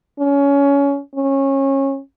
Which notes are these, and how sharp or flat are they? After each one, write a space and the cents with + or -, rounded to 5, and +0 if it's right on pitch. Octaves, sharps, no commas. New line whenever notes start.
C#4 +20
C#4 -25